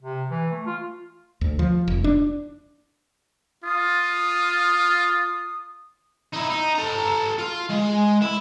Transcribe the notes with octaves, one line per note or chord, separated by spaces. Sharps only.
C3
E3
A3
F4
D2
F3
F1
D4
F4 D#6
D#4 E4
D#4
A4 A#5
F4
G#3
E4